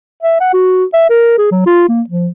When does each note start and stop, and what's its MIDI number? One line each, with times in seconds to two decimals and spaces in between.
0.23 0.40 76
0.41 0.50 78
0.53 0.85 66
0.94 1.08 76
1.10 1.34 70
1.38 1.47 68
1.51 1.63 54
1.66 1.85 65
1.89 2.02 58
2.10 2.28 53